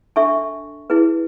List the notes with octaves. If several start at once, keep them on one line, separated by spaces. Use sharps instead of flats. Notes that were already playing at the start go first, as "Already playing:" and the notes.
D4 A4 E5 A5 C#6
E4 G#4 B4